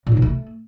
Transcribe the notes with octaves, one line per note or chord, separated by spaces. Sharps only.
A#2
D#4
B2
A3